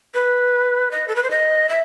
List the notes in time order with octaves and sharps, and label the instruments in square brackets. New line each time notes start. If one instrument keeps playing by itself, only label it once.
[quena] B4
D#5
A4
B4
C5
D#5
E5